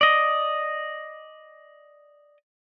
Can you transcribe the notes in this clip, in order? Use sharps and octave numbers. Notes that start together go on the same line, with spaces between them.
D5 D#5